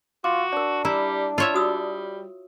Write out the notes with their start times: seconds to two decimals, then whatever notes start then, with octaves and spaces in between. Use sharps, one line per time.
0.24 F4 F#4 D6
0.53 D4 A#4 D5
0.85 G3 E4 A#5
1.38 F4 C#5 E5
1.54 G3 F#4 D#6 E6